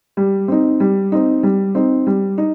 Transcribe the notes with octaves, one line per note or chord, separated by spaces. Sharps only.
G3
C4 D#4
G3
C4 D#4
G3
C4 D#4
G3
D#4